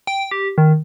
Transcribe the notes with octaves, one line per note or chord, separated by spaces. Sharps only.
G5
G4
D#3